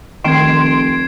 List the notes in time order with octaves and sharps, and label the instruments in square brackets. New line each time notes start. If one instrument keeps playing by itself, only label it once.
[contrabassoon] F1 [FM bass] D#3 [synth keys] C6 D7 [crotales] G#6 C7 E7